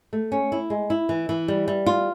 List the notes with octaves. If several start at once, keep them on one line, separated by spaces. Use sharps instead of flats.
A3
C#4
E4
G#3
E4
E3
E3
G3
G3
F4